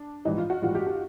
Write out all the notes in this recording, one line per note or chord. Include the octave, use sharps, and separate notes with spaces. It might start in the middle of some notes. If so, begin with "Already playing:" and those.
Already playing: D4
A#1 G#2 E3 G3 D#4
F4
F#4
A#1 G#2 E3 G3 F4
G4
G4